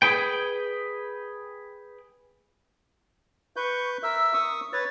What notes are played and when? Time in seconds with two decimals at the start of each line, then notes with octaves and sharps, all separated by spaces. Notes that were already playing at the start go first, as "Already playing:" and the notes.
0.02 G#4 B4 G5
3.56 B4 C#6 G6
4.03 A#4 E5 E6
4.33 C#6 D#6
4.73 B4 C#5 A6